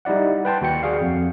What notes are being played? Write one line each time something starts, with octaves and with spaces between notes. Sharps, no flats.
G3 D#4 E4 D5 F#5
B4 G5 A5 C6
D#2 F#4 G5 C#7
F#4 G#4 D5 F5
F2